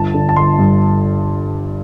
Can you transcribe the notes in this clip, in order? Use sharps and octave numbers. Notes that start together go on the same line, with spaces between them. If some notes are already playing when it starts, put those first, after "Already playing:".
Already playing: G1 A5
D3
A5
G1 C6
G2